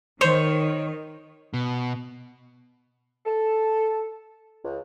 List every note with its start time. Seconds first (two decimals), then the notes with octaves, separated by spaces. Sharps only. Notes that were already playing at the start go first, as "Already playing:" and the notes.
0.21 D#3 C5 C#5
1.54 B2
3.26 A4
4.63 C#2